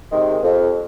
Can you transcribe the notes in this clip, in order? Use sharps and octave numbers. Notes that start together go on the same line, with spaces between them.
C3 D#3 G#3
F2